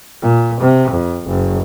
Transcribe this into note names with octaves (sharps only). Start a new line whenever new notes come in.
A#2
C3
F2
F#1